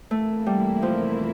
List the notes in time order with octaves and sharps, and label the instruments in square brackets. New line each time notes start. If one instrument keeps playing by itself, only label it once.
[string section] E2 C3 E3 A#3 E4 [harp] A3
[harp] G3
F3